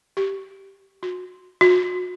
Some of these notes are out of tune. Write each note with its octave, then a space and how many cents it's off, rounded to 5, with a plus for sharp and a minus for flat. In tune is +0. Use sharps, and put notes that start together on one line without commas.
G4 -5
F#4 -30
F#4 -35